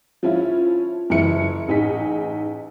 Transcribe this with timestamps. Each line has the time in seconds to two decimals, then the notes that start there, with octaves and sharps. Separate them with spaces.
0.23 F3 C#4 E4 F4
1.10 F#1 E3 E4 C#7
1.68 A1 D#4 G#4 B6